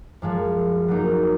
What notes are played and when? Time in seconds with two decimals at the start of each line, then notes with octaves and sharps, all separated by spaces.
0.22 F#2 F3 G#3
0.88 F#3 A#3 D#4